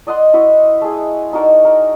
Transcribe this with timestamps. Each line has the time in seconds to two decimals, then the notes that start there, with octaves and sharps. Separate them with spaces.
0.07 D5 D#5 F#5 C6
0.33 E4 F#4 D#5
0.81 A3 G#4
1.33 D#4 F#4 A#4 D5
1.65 A#4